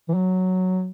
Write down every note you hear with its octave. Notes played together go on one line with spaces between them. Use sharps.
E3
F#3